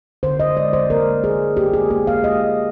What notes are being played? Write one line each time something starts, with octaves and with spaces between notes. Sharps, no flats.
D3 C5
D#5
G#3 D5
C5
A#3 A#4
A#3 G#4
A#3 G4
G#4
A#3 G#4
F5
G#3 D#5